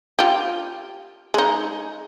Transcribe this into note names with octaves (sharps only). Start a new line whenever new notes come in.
F4 G4
G#3 D#4